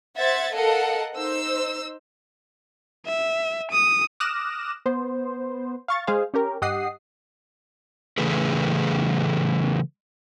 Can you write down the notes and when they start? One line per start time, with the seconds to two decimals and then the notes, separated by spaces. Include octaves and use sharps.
0.18 C5 E5 F#5 G#6 A6
0.55 A4 A#4 D#5 F5 F#5
1.15 D#4 C5 E6
3.06 E5
3.71 D#6
4.20 D6 D#6 F6 F#6 A#6 E7
4.86 B3 C5
5.88 F5 C#6 A6
6.07 G#3 G#4 C5 F5
6.34 C#4 G4 A#4
6.62 G2 G4 D#5 F#5 D#6 C7
8.18 C#3 E3 A3 G#4 A4 B4